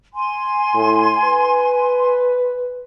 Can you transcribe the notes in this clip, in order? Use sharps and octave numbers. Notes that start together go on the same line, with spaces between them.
G#5 C6
A2
B4